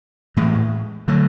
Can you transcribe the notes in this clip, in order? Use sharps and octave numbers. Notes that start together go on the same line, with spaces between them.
A2 E3 G#3
D3 F#3 A3